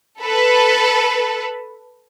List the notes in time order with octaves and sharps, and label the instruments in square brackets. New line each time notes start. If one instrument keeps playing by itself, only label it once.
[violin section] A4 B4